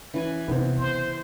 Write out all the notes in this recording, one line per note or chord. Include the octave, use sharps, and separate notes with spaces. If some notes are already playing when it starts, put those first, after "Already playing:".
E3 C#4 B4 G#5
C3 D#3 B3 C4
C#3 C5